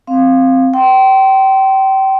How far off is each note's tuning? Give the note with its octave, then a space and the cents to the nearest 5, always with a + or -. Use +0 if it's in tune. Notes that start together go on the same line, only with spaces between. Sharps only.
C4 +0 F5 +0
G5 -30 C6 +0